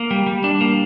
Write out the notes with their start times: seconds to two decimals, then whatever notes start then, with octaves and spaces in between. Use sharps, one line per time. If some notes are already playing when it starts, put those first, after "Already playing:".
Already playing: A#3
0.11 G3
0.26 G3
0.44 D4
0.61 A#3